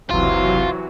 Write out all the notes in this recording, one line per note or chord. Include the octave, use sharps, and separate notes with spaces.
F#1 C#2 C3 E3 F#3 F4 F#4